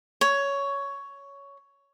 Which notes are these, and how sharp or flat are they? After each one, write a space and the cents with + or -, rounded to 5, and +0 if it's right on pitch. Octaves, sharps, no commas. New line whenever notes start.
C#5 +10